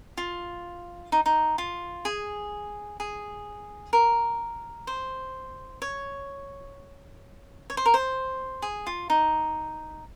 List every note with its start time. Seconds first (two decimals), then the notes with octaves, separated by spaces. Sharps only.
0.18 F4
1.12 D#4
1.26 D#4
1.58 F4
2.05 G#4
3.00 G#4
3.93 A#4
4.87 C5
5.82 C#5
7.70 C#5
7.77 C5
7.86 A#4
7.94 C5
8.62 G#4
8.87 F4
9.10 D#4